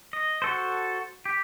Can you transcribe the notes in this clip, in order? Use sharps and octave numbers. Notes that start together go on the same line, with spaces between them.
D#5
F#4 A4 C5
G4